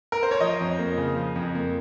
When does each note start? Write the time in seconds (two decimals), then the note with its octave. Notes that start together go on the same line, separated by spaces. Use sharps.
0.12 A#4
0.23 C5
0.31 C#5
0.41 F3 D#5
0.61 F2
0.79 A#3
0.97 C#3
1.16 F3
1.36 F2
1.55 A#3